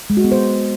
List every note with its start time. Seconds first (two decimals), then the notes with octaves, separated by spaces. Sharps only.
0.10 G#3
0.17 F#4
0.24 B3
0.32 C5